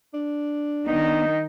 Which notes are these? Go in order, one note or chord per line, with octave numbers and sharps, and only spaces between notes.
D4
D#3 B3 D#4